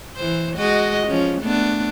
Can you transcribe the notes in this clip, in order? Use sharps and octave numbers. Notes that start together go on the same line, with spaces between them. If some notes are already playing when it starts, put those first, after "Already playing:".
E3 C5
G#3 F#4 D#5
F3 C#4
A3 B3 D4